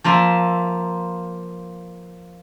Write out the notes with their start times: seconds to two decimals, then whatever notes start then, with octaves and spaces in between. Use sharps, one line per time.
0.04 F3 A#3 F4 E5